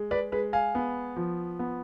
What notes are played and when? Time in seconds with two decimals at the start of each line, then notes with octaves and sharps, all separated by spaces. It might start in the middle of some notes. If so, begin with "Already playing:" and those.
Already playing: G#3
0.11 B4 D5
0.32 G#3 B4
0.53 F5 G#5
0.75 B3
1.16 F3
1.59 B3